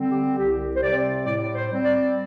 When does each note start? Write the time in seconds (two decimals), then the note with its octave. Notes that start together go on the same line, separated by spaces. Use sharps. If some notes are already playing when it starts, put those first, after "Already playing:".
Already playing: D3 G3 C4
0.09 G4
0.38 C2 G4
0.76 C5
0.82 C3 G3 C4 D5
1.26 A2 D5
1.55 C5
1.71 G3 C4
1.85 D5